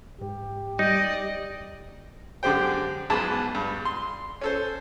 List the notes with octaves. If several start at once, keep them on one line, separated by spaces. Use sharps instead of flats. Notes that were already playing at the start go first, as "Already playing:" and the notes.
G#2 G4
G3 D#4 D5 D#5
F#2 D3 G#3 G4 C5 G5
B1 G#2 G#3 B3 A5
G2
C6
C#4 A4 C5